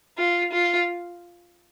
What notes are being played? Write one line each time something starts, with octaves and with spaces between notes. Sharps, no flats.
F4
F4